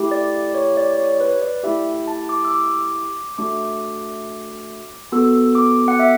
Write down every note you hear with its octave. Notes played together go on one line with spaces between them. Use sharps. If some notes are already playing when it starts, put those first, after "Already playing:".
Already playing: A3 E4 G4
D5
C#5
D5
C#5
B4
D5
A3 E4 G4 E5
A5
D6
E6
D6
A3 D4 F#4 D6
B3 F#4 A4 E6
D6
F#5
E5